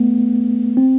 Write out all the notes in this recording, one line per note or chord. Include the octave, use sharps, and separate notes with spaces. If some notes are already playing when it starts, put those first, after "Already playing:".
Already playing: A3 B3
C4